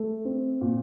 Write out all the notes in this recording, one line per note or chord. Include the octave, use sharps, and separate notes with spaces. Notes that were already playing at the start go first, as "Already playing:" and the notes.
Already playing: A3
C4
A#2